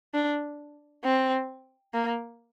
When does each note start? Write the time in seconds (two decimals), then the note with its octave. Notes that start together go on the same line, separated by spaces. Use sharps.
0.14 D4
1.04 C4
1.94 A#3